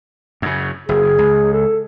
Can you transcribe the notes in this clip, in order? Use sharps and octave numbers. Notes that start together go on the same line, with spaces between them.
F#2 C#3
F#1 G#4
C#2
A4